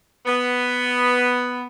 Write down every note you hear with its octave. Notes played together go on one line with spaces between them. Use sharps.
B3